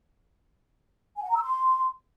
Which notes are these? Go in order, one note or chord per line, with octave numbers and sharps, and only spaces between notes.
G#5
F#5
A#5
E6
C6